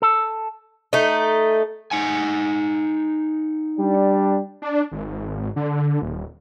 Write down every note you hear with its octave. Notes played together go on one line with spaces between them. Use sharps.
A4
A3 D#4
D#4 F#5 G#5
G3 D4
D4
G#1
D3
D#1